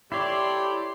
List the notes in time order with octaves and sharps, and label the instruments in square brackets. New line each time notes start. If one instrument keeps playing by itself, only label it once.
[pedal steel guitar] E4 C#5 [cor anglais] G4 [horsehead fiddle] A4 D5 [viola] C6